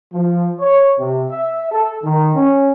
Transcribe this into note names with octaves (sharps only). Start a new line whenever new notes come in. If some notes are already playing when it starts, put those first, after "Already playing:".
F3
C#5
C3
E5
A4
D#3
C#4